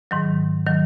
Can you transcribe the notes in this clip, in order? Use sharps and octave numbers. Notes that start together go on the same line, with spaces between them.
G#2 D#3 F#3
D#3 F#3